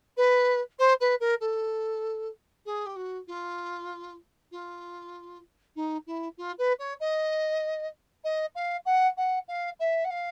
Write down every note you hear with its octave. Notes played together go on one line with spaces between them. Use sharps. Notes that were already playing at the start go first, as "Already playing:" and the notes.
B4
C5
B4
A#4
A4
G#4
G4
F#4
F4
F4
D#4
E4
F4
B4
C#5
D#5
D#5
F5
F#5
F#5
F5
E5
F#5
F5